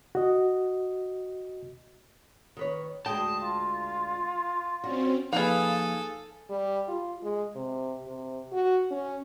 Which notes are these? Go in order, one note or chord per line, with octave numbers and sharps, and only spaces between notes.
F#4 D#5
D#3 B4 C#5
D2 G#3 G5 A5 D#6
F4
G3 C4 C#4 F#4
F3 A#3 D#4 G#4 A4 B4 F5 G#5
G3
F4
G#3
C3
C3
F#4
C#4